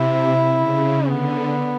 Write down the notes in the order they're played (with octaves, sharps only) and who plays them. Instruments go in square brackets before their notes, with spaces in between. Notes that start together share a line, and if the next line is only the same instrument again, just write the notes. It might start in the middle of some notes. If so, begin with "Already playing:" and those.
Already playing: [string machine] C3 [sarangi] E4
[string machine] C#3
[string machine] D3 [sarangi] B3